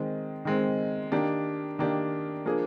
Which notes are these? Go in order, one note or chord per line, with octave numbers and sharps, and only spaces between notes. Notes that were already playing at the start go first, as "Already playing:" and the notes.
Already playing: D#3 G#3 C4
D#3 G#3 C4
D#3 A#3 D4 G4
D#3 A#3 D4 G4
F3 A#3 D4 G#4